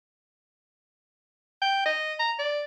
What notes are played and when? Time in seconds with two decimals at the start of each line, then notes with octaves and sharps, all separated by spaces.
1.62 G5
1.85 D#5
2.19 A#5
2.39 D5